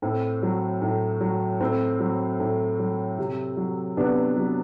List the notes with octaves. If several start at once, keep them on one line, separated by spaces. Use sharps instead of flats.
A2 C4
F#3
A2
F#3
A2 C4
F#3
A2
F#3
C3
F#3
C3 B3 D4
F#3